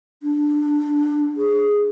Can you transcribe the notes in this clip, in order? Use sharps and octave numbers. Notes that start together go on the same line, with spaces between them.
D4
G#4